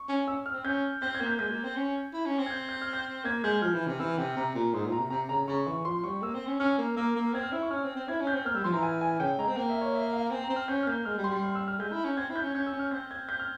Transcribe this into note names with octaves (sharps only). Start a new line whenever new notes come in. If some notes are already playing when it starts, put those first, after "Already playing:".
Already playing: C#6
C#4
C#4 E6
F6
C4
C#4 G6
C4 G6
G#6
A#3
G6
G#3 G6
A#3
C4
C#4
E4
C#4
C4
G#6
G6
G6
F6
G6
A#3 G#6
G#3 G6
F3 F6
E3
C3
E3 E6
C3 G5
C3 A#5
A#2
G#2 C6
A#2
A#5
C3
C3 A#5
C#3 A#5
C#3 C#6
E3 C#6
F3 C6
G3 C#6
A#3 E6
C4
C#4
C#4 F6
A#3
A#3 E6
A#3
C4 G#6
F6
E4 E6
C#6
C#4 F6
C4
C4
E4 G#6
C#4
G6
C4
A#3 F6
G3 E6
F3 C6
E3 A#5
G#5
G#5
C#3 G5
G#3 A#5
C4
A#3 G5
E5
C#5
E5
F5
C4 G#5
A#5
C4
F6
C#4 G6
F6
A#3 G6
G#3 F6
G3
C6
G3
C6
E6
F6
G#3 G6
E4
C#4
C4 G#6
E4
G6
C#4
C#4 G6
E6
C#4
F6
C4 G6
G#6
G6
F6